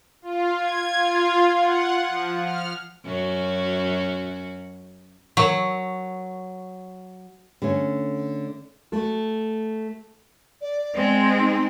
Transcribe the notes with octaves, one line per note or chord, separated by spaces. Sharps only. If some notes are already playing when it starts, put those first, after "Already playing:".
F4
G#6
F4
F#5
F3
F6
F#2 C#4 F#4
F#3 A#4 C#6
D3 A3 C#4
A3 F#4 A4
D5
G#3 C4
D#4